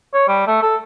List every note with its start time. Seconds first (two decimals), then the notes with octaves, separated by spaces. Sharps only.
0.14 C#5
0.28 G3
0.47 A3
0.62 A4